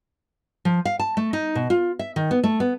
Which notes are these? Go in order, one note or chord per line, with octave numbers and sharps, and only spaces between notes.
F3
F5
A5
A3
D#4
B2
F4
E5
D#3
B3
A3
B3